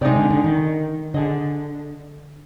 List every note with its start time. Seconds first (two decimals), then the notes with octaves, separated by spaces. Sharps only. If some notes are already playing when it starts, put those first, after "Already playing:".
0.01 C3 G#3 D#4 G4 D5
0.16 D3
0.30 D3
0.44 D#3
1.14 D3 D4 G#4 D#5